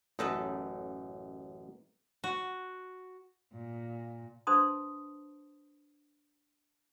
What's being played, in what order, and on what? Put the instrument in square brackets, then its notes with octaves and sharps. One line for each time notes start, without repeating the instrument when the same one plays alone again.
[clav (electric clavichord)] A1 F#2 [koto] D#4 A4 B4
[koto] F#4
[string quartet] A#2
[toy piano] D4 B4 C5 A5 C6 D#6